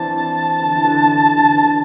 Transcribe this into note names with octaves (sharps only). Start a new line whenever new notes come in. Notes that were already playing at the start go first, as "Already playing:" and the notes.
Already playing: E3 C4 D4 A5
D3
E3
D3
D3
D3